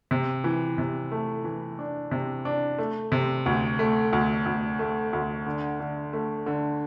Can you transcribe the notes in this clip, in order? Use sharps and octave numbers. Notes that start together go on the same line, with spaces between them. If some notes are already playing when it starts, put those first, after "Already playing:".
C3
E3
C3
A3
E3
D4
C3
D4
A3
C3
D2
A3
D2
D2
A3
D2
D3
D3
A3
D3